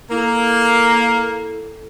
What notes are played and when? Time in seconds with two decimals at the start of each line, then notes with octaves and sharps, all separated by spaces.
0.11 A#3 E4 A4